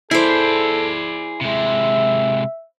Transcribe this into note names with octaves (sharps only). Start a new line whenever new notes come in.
E4 G#4 A4 C5 D5
C3 G#3 E5